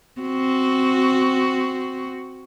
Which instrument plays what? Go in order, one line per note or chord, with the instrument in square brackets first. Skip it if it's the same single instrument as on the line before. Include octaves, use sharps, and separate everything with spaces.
[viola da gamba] C4 F#4